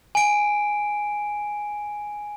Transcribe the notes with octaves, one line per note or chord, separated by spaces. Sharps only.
G#5 D7